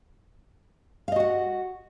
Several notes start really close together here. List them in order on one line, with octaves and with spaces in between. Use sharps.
F5 D#5 F#4 F#5